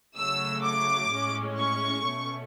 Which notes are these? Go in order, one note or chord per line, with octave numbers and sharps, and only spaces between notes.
C#3 F#3 A3 E6
D6
A2 G#3 C#4
C#6
B2 A3 C#4